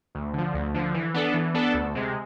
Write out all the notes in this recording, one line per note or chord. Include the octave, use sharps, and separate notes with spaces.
D2
D3 F3
D2
D3 F3
E3
B3 D4 A4
E3
B3 D4 A4
D2
C3 G#3